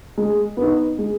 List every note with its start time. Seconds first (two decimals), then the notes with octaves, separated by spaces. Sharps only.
0.18 G#3
0.57 B3 D#4
0.98 G#3